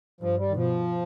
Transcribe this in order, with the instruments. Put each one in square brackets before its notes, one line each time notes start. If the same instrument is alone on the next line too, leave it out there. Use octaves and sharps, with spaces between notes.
[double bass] G2 [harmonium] F3
[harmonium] G3
D#3
[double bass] B2 [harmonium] F3